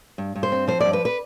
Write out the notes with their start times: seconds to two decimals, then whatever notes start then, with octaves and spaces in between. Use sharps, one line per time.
0.18 G2
0.36 G2
0.43 C5
0.52 C4
0.68 F3 C5
0.80 G2 D5
0.93 B4
1.05 B4